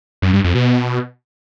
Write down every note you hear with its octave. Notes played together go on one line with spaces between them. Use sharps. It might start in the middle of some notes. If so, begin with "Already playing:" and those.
F#2
G2
F2
B2